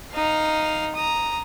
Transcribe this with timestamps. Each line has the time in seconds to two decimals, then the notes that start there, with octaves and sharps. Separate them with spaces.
0.13 D#4 F5
0.95 A#5 D#6